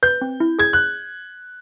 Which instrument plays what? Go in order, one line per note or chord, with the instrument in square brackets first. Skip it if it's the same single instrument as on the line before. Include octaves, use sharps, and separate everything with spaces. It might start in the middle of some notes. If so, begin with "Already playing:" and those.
[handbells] B4 [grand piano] G6
[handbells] C4
E4
[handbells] G#4 [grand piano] G#6
[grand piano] F#6